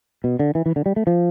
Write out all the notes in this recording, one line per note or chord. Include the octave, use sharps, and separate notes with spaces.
B2
D3
E3
E3
D3
G3
A3
F3